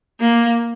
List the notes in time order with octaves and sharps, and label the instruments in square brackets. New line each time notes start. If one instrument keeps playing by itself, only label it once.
[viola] A#3